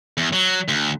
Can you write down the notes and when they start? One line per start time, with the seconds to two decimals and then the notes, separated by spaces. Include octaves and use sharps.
0.17 E2
0.33 F#3
0.68 D2